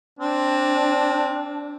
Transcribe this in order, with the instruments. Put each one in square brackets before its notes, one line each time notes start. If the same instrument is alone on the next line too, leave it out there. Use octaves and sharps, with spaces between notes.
[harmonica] C4 [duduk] D4